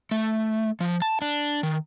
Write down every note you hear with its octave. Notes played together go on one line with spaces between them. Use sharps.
A3
F3
A5
D4
D#3